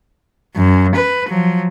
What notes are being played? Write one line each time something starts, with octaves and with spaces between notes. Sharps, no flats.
F#2
B4
F3 F#3